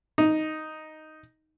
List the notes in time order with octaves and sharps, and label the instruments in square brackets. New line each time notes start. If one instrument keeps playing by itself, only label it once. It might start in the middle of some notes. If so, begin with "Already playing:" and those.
[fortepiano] D#4